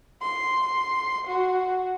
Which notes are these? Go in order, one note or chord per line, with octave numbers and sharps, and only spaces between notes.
C6
F#4